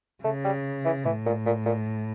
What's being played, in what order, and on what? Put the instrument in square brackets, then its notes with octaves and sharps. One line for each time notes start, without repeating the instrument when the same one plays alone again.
[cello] C#3 [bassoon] A3
[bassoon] G3
E3
[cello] A2 [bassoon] E3
[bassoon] A#2
A#2
A#2